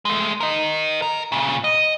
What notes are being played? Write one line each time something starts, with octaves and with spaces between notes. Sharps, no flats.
G#3 A3
A#4 D#5
A#4
A#2 C#3
D#5